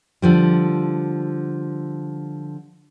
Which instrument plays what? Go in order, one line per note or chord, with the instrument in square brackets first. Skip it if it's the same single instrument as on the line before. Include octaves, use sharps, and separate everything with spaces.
[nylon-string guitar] D3 F3 G3